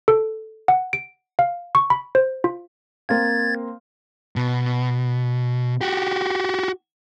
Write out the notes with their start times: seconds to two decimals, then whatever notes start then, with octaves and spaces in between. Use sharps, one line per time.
0.08 A4
0.68 F#5
0.93 D7
1.39 F5
1.75 C#6
1.90 B5
2.15 C5
2.44 F4
3.09 A#3 C4 F5 G#6 A6
4.36 B2
5.81 F#4 G4